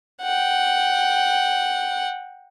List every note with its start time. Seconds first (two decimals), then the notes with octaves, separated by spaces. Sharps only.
0.22 F#5 G5